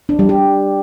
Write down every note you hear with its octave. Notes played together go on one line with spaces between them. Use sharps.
D4
G3
G4